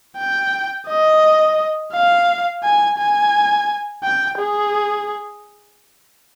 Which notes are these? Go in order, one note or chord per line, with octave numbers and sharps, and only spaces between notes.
G5
D#5
F5
G#5
G#5
G5
G#4